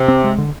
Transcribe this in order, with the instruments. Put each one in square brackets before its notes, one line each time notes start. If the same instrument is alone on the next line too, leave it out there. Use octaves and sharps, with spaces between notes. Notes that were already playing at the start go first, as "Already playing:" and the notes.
Already playing: [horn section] C3
[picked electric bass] C4
G#3
D3